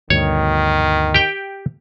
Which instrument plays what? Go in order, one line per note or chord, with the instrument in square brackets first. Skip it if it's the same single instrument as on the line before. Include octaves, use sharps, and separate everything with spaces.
[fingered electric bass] D2 G2 B2 [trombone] D#3 [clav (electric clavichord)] C#5
[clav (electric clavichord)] G4 G5